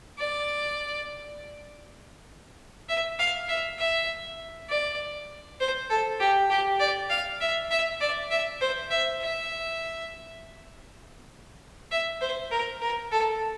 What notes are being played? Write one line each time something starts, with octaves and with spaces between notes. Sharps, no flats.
D5
E5
F5
E5
E5
D5
C5
A4
G4
G4
D5
F5
E5
E5
D5
E5
C5
E5
E5
E5
C5
A#4
A#4
A4